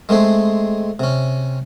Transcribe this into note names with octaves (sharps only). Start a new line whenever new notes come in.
G#3 A3 C4 G#4
C3 C#4